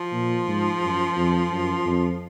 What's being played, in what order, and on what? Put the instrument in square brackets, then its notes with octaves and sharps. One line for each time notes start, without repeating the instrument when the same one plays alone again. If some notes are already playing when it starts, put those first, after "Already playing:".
Already playing: [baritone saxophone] F3
[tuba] A#2
G#2
F#2
F2
F#2
F2